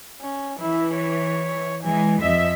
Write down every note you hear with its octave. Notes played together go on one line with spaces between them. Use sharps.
C#4
E3 E4
C#5
E3 G#3 G#5
F2 D#5 E5